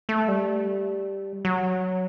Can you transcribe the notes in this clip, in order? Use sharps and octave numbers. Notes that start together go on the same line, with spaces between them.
A3
G3
F#3